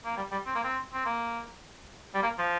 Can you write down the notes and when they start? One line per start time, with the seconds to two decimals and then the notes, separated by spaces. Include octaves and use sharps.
0.05 A#3
0.17 G3
0.32 G3
0.46 C4
0.55 A#3
0.64 C4
0.94 C4
1.06 A#3
2.14 G3
2.23 A#3
2.38 F3